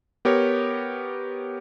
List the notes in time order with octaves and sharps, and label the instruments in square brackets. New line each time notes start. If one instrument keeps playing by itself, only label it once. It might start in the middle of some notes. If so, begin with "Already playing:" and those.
[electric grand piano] B3 G4 A#4 C#5